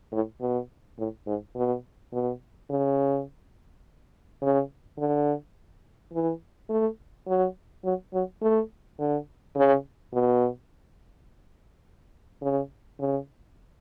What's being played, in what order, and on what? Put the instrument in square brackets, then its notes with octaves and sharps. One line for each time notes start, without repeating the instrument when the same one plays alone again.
[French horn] A2
B2
A2
G#2
B2
B2
C#3
C#3
D3
E3
A3
F#3
F#3
F#3
A3
D3
C#3
B2
C#3
C#3